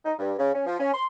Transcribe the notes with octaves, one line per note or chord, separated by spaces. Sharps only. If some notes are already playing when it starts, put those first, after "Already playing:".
D#4
G2
C#3
C#4
F3
C#4
C6